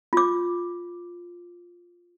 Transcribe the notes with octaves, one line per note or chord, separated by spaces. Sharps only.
F4 D6